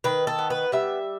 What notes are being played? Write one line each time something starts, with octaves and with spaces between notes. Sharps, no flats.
D#3 B4
A4
B3
B4
G3 E5